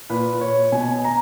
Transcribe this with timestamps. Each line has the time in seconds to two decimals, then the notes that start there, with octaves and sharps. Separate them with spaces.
0.09 A#2 B4
0.41 C#5
0.72 B2 G#5
1.04 A#5